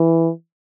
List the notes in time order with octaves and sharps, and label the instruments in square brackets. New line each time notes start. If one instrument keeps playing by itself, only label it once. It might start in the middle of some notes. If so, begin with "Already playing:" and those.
Already playing: [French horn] E3